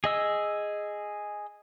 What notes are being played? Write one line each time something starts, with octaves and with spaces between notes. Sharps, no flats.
G#4 D#5 E6